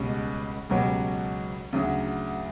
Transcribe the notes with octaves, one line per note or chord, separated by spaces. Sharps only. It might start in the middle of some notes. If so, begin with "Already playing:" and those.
Already playing: C#2 B2 G3 C#4
C#2 B2 F#3 C#4 G4
D2 C#3 F#3